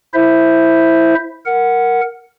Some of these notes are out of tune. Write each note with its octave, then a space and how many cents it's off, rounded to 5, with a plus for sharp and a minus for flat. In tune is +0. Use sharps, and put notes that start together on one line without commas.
E4 +0 C5 +0 E5 +0
A#4 +0 F#5 +0